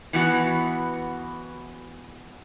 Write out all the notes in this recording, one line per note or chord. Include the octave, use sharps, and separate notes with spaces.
E3 B3 F#4